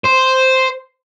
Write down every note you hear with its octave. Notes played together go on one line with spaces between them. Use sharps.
C5